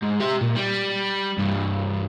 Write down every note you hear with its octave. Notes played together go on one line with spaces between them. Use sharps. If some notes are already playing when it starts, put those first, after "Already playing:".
G#2
G4 E5
A#2
G3
C2 G2